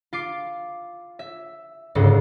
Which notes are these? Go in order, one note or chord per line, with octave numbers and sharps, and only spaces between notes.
F4 D6 C7
E5
G1 C#2 G#2